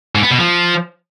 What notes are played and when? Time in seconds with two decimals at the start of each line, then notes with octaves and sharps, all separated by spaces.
0.15 G#2
0.23 B3
0.31 B2
0.39 F3